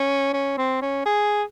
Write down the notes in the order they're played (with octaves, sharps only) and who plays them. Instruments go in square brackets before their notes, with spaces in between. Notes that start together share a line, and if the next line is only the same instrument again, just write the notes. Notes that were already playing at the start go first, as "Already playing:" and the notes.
Already playing: [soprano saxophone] C#4
C#4
C4
C#4
G#4